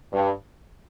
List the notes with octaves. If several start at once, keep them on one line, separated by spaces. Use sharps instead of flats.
G2